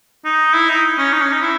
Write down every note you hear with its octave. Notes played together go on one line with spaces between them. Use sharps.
D#4
E4
D#4
C#4
D#4
C#4
D#4
E4